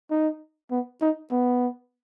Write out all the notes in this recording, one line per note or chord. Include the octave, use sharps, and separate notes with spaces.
D#4
B3
D#4
B3